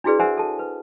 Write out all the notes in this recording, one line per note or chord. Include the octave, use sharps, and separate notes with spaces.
D4 E4 F#4 G#4 B4 D5
A#4 C5 E5 F#5 G#5
A4 A5
B4